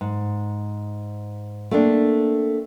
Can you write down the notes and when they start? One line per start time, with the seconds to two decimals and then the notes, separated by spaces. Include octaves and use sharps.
0.01 G#2
1.71 A3 A#3 C4 D4